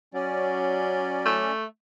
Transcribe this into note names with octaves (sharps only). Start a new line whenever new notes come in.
F#3 C#4 D5
A3